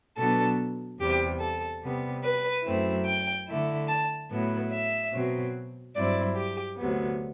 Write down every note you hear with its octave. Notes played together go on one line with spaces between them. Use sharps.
B2 F#3 B3 D4 A4
E2 C3 G3 G4
A4
C3 G3 B3
B4
F#2 F#3 A3 C4 E4
G5
D3 A3 E4
A5
A2 F#3 B3 E4
E5
B2 F#3 C4
G2 F#3 C4 E4 D5
G4
D2 C3 F#3 B3